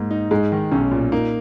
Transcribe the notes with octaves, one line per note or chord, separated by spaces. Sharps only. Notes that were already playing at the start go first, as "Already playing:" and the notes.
Already playing: G#2 A#3
D#4
G#2 G#3
D#3
B1 C#4
A#2
A#3 D#4